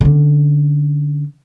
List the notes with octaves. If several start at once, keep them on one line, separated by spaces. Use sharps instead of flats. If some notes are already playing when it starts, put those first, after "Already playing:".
D3 C#4